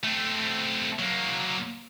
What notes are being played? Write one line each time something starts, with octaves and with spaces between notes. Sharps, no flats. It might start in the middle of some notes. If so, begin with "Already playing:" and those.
A3 C4
F#3 A#3